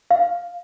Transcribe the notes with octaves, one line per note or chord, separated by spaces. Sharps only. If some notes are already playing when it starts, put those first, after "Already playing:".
F5